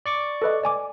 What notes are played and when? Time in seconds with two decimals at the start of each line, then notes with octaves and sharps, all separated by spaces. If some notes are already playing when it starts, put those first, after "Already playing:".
0.06 D5 C#6 D6
0.42 A4 B4 D#5
0.63 D5 G#5 D6